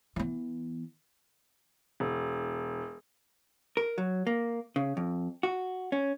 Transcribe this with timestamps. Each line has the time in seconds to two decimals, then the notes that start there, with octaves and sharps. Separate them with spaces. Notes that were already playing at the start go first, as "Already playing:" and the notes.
0.16 E3 B3
2.00 E1
3.77 A#4
3.98 F#3
4.27 A#3
4.76 C#3
4.97 F2
5.43 F#4
5.92 C#4